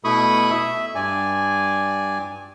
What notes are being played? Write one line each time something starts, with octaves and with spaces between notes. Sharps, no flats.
B2 A3 E4 B5 C#6 D#6
E5
G2 D5 G#5